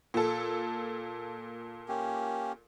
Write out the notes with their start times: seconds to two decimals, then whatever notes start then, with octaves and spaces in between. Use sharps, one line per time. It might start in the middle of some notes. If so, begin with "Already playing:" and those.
0.14 A#2 A4
1.88 A#3 C#4 G4